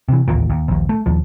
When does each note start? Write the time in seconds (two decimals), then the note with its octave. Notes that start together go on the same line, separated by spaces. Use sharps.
0.09 C3 E3
0.28 D1 A1 D#2 A#2
0.50 D#2
0.68 A#1 D#2
0.89 A3
1.06 D#1 D#2 F3